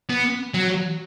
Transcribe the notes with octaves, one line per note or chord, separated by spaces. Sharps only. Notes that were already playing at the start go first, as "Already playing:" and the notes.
B3
F#3